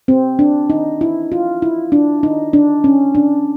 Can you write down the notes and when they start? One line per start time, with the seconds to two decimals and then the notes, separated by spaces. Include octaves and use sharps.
0.08 C4
0.39 D4
0.70 D#4
1.01 E4
1.32 F4
1.62 E4
1.92 D4
2.23 D#4
2.53 D4
2.84 C#4
3.15 D4